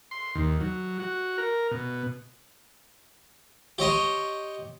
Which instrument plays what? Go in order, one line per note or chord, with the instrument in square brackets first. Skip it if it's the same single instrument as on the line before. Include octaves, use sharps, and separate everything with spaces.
[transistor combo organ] C6
D#2
F#3
F#4
A#4
B2
[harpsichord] G4 C#5 D#5 C6